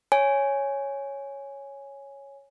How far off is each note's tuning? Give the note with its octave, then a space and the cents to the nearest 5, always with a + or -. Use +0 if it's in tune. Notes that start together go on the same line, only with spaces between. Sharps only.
C#5 +0 G#5 +0